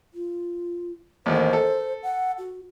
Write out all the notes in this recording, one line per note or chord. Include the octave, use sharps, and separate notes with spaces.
F4
A1 D#2 C5
A4
F#5
F#4